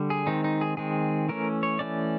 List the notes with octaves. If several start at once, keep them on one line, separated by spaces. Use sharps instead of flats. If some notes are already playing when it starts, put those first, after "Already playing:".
Already playing: D3 G3
G#4
D#3 G#3 C4 D#4
D#4
G#4
D#3 G#3 C4 G#4
E3 A3 C#4 A#4
C#5
E3 A3 C#4 D5